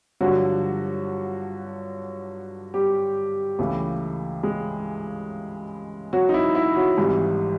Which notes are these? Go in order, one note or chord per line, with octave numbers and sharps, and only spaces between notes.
G2 D3 F3 F#3 F#4
G3 G4
C#2 C#3 E3 A3
G#3 G#4
F#3 F#4
D#4
E4
E4
F#3 F#4
G#1 G#2 E3 G3